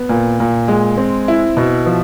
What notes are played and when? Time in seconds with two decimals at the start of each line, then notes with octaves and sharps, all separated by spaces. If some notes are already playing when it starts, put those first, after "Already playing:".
Already playing: B3
0.09 A#2
0.40 A#2
0.68 G#3
0.98 C4
1.28 E4
1.57 B2
1.86 F3